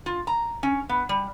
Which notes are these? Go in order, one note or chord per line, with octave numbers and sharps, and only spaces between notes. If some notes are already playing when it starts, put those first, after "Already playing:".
F4
A#5
C#4
B3
G3